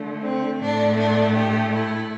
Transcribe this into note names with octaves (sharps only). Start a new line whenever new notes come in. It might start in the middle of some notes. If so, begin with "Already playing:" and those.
Already playing: D3 A3
C4
A2 A3 D4
D4
G4
E4